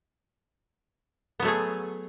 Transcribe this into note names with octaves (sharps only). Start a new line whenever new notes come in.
F#3 A3 B3 G#4